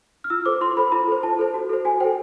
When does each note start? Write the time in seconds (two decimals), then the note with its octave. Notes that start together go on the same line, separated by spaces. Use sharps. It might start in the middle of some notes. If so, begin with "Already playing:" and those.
0.24 F6
0.30 F4 E6
0.46 A4 C5 D6
0.61 F4 C6
0.77 A4 C5 B5
0.92 F4 A#5
1.08 A4 C5
1.23 F4 A5
1.39 A4 C5
1.54 F#4
1.69 A4 C5
1.85 F#4 G#5
2.00 A4 C5 G5